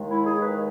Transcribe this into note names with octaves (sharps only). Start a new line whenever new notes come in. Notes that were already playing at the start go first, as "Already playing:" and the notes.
Already playing: D#2 D#3 G#3
E4
G#4
B4